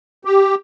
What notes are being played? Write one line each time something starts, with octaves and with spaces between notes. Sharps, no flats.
G4